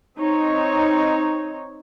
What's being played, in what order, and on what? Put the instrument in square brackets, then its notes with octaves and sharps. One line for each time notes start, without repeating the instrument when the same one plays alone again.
[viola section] C4 D#4 C#5